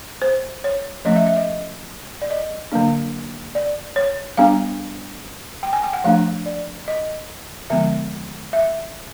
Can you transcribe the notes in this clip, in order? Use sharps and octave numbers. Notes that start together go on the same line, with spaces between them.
C5
C#5
F3 A3 C#4 D#5
E5
E5
D#5
D5
D#5
D3 F#3 A#3 D4
D5
C#5
G3 B3 D4 F5
G5
G#5
G5
F#5
F3 A3 D4 F5
D5
D#5
D3 F3 G#3 B3 E5
E5